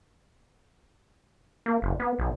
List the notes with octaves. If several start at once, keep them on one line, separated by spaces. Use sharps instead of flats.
A#3
F#1
B3
B1